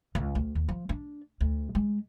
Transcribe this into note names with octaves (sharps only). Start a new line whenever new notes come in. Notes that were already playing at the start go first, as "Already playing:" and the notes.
C#2
D2
D#2
F3
D4
D2
G#3